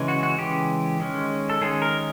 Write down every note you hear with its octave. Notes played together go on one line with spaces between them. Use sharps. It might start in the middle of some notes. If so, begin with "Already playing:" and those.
Already playing: C#3 E3 G#3
F#4
F#4
C#3 E3 G#3 G4
D#3 G#3 C#4
A4
D#3 G#3 C#4 G#4
A#4